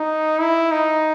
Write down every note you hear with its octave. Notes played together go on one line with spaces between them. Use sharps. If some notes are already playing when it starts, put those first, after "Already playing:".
Already playing: D#4
E4
D#4